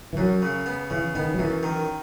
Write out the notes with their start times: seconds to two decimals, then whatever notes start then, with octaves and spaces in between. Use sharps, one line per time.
0.13 E3
0.17 F#2 F#3
0.42 C#3
0.66 B3
0.90 C#3 E3
1.15 D#3 B3
1.34 F#3
1.39 F#2 E3
1.63 D#3